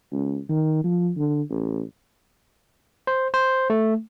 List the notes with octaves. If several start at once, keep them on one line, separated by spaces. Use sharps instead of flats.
C#2
D#3
F3
D3
A1
C5
C5
A3